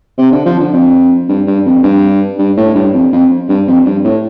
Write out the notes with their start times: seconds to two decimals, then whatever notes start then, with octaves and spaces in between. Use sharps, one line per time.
0.18 C3
0.32 D3
0.45 F3
0.60 D3
0.73 F2
1.29 G2
1.47 G2
1.65 F2
1.83 G2
2.39 G2
2.57 A2
2.75 G2
2.94 F2
3.12 F2
3.49 G2
3.67 F2
3.85 G2
4.04 A2